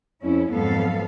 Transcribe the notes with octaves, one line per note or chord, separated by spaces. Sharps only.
F2 C#4 E4
F2 G#2 F#3 B3 A4 F5